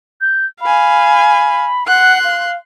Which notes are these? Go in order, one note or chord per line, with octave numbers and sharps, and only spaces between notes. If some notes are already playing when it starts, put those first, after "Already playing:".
G6
F5 G#5 B5
F#5 C6 F#6
F5